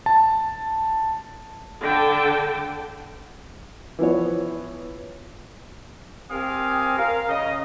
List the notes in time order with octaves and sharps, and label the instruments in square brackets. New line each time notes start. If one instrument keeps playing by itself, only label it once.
[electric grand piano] A5
[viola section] D3 G5 A5
[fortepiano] E3 F3 B3 C#5
[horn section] C4 G4 G#4 A#4 F5 G#5
A#4 F5
C#3 D#5